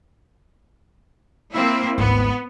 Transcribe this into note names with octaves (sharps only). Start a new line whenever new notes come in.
A#3 C4 E4
G#1 D2 B3